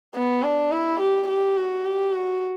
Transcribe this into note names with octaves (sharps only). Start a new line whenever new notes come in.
B3
D4
E4
G4
G4
F#4
G4
F#4